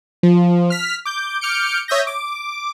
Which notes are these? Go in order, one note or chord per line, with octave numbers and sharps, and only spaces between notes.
F3
F6 B6
D6 G6
D6 F6 G6 C#7 D7
C#5 E5 D#6 G6 A#6
D6